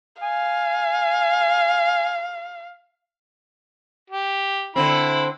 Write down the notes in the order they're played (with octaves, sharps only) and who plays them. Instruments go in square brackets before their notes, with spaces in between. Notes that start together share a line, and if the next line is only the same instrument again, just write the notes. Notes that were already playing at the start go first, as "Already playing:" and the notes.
[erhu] F5 [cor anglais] G#5
[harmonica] G4
[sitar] D3 C4 [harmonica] E4 B5